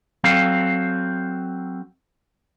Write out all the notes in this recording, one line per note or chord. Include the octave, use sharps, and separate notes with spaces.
F#3 C4 A4 F5